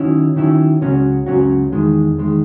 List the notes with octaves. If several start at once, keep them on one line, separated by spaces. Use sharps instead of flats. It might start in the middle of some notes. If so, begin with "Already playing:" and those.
Already playing: D#3 F#3 C#4 E4
D#3 F#3 C#4 E4
C#2 C#3 F#3 C#4 F#4
C#2 C#3 F#3 C#4 F#4
E2 D#3 G#3
E2 D#3 G#3